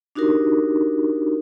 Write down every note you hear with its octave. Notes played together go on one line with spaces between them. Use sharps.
D4 D#4 F#4 G4 A#4